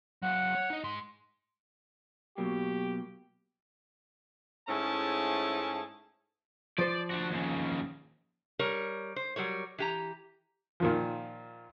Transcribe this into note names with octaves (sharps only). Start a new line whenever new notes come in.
F#3 F5 F#5
C#5
D#4 D#5
G#2 C6
B2 F#3 A#3 G4
G#2 A3 C#4 E4 G#4 A5
F3 C5 D5
D4 F#4
D#2 C#3
G3 A#4 C#5
C5
F#3 G3 A#4 C#5
E3 G4 A#5
A#2 D#3 F3